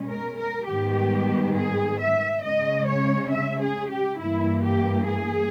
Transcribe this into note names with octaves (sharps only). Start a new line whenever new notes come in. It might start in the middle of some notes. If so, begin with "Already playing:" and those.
Already playing: B2 G#3 C#4
A#4
A#4
G#2 D#3 G3 B3 G4
G#4
E5
C#3 G#3 C#4 D#5
C#5
E5
G#4
G4
G2 E3 A#3 E4
G4
G#4